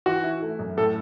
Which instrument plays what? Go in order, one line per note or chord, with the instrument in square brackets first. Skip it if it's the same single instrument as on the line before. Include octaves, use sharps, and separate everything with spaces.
[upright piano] E3 [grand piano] F#4
[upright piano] E4
A3
F#2
[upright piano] A2 [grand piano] A4